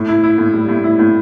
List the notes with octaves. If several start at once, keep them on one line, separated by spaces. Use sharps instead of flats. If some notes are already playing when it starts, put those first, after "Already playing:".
Already playing: A2
E4
E4
A2
G3
A2
E4
A2